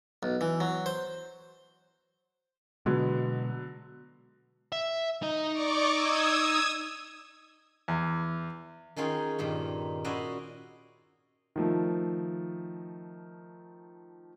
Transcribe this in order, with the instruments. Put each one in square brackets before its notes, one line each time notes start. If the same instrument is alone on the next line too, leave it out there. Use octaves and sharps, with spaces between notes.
[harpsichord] B1
E3
F#3
C5
[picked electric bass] B2 G#3 [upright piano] D3 F#3 B3
[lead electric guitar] E5
D#4 D#5
[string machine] D5 C#6 D6
D#6 E6 G#6
[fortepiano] E2
[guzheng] D#3 C#4 F4 G#4 G5 C6
G2 A#2 D#3
C#4 E4 F#4 C5 D5 D#5
[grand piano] D#3 F3 A3